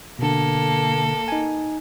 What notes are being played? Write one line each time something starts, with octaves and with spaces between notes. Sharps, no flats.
B2 D3 A#3 A4
D#4 G#5